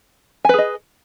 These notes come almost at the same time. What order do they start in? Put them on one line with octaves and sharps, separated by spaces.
G#5 B4 G#4 D#5